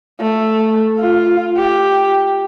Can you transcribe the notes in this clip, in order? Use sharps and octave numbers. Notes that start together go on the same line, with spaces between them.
A3
F4
G4